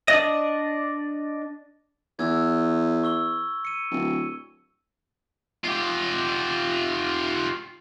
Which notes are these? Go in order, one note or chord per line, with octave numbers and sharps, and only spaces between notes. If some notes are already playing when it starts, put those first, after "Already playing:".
D4 D5 D#5
E2 E6 G#6
C#6 E6 G7
C#7 D#7
D1
F4 G4